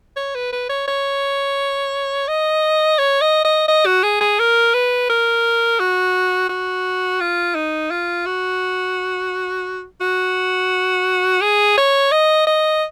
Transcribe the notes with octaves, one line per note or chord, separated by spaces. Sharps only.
C#5
B4
B4
C#5
C#5
D#5
C#5
D#5
D#5
D#5
F#4
G#4
G#4
A#4
B4
A#4
F#4
F#4
F4
D#4
F4
F#4
F#4
G#4
C#5
D#5
D#5